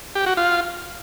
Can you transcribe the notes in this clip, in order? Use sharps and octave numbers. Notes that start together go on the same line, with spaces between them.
G4
F#4
F4